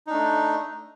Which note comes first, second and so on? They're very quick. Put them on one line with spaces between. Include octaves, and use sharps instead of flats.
D#4 D4 A3